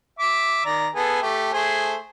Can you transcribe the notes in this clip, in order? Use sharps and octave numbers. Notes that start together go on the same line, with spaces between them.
E5 D6
D#3 D5 A#5
B3 G#4 A4
A3 G4
A3 G#4 C5